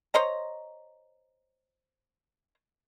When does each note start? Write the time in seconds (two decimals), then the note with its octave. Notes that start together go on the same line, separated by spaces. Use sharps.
0.14 C5 C#5 D#5 A#5